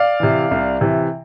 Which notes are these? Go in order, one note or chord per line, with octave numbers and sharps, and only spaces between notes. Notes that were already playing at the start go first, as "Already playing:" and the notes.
Already playing: D5 F5
C3 E3
C2
C3 E3